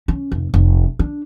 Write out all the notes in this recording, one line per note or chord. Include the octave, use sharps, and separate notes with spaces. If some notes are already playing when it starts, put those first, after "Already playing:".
C#4
F1
F1
D4